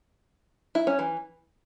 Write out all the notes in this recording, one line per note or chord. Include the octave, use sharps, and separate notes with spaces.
E4
C#4
E3